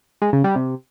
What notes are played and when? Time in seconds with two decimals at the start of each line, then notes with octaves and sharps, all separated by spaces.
0.22 G#3
0.33 C#3
0.44 G3
0.56 C3